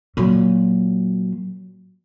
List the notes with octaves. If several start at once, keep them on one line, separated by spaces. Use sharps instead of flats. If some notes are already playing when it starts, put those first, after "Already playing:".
A#2 F#3